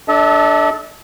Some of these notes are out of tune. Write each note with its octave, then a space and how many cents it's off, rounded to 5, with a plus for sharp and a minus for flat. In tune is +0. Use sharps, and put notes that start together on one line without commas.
D4 +0 A4 -15 E5 -45